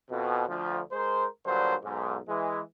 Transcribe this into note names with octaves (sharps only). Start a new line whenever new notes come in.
F2 B2
D2 F3
G#3 A#4 C5
G2 A#2 D3 F#3 C5
B1 G#2
E3 G#3